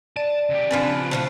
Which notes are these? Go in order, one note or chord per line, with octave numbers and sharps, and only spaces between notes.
D5 A5
C#3 G4
F3 C4 D4 B4 G#5
F3 F#3 A3 C5